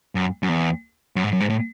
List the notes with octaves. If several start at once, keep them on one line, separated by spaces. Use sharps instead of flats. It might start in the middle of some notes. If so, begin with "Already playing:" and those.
F#2
F#2
E2
F#2
G#2
F#2
G#2
A2